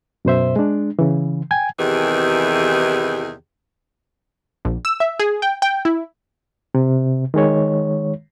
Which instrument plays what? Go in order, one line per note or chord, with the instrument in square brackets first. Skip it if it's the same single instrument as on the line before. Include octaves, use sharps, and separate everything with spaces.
[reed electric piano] F#2 B2 C5 E5
G#3 D4
C#3 E3
G5 G#5 G#6
[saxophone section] E2 C3 D#3 E3 G4 G#4
[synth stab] A#1
E6
E5
G#4
G5
G5
E4
[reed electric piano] C3
D#3 G#3 C#5